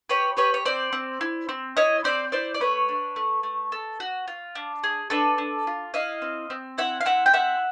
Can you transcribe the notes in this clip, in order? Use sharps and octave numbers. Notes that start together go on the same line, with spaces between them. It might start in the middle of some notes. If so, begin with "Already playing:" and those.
G4 B4 C#5
G4 B4 C#5
C#5
C4 C5 D5
C4
E4
C4
E4 C#5 D#5
C4 C5 D5
E4 C5 D5
D5
A3 B4 C#5
D4
A3
A3
A4
F#4
F4
D4
G#4
D4 A4 B4
D4
F4
E4 D#5 F5
C4
C4
E4 E5 F#5
F5
C4 E5 F#5
G5
E4 E5 F#5